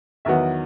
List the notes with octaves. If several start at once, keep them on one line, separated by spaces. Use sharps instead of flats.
E2 D#3 F#3 B3 E5